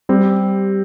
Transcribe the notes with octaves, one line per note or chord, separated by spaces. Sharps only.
G3 C4 G4